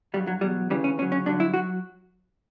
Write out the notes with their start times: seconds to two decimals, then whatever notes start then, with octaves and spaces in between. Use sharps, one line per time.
0.14 G2 F#3 G3
0.27 F#3
0.41 E2 B2 F#3 G3
0.69 D2 C#3 E3 G3
0.84 C#4
0.98 D2 C#3 F#3 C#4
1.12 C#4
1.26 G2 D3 F#3 D4
1.40 E4
1.54 F#3 F#4